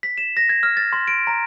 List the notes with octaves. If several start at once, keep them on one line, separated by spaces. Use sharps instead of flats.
B6
E7
A#6
G#6
F6
A6
C6
D7
A#5